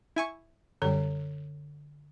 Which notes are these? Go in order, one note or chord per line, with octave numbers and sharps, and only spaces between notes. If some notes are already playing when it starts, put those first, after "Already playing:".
E4 G#5 C#6
F#2 D3 G3 C#5